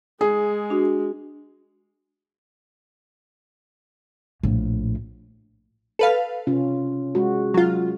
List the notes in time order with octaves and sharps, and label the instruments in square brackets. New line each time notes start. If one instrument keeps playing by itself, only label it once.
[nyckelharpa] G#3 [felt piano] G#4
[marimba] D4 F#4
[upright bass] A#1 A2
[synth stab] A4 B4 F5
[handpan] C3 C#4 F4
G#3 F#4
[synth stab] F#3 F4